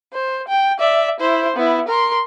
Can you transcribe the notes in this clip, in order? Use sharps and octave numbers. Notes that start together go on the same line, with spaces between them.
C5
G5
D5 E5
E4 C5
B3 E4
A#4 C6